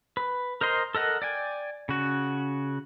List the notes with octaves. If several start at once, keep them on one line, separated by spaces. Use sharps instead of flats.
B4
A#4 C5 D#5 C6
A4 A#4 D#5 F#5
D5 G5 G#5
C#3 F#4